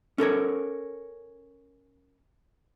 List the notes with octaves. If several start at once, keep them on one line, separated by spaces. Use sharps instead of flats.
C#4 A4 A#4 C#5